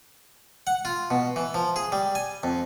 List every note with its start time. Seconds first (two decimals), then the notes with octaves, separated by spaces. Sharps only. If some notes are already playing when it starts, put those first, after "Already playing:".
0.67 F#5
0.85 F4
1.11 B2
1.36 E3
1.54 F3
1.76 G#4
1.92 G3
2.15 G#5
2.43 F2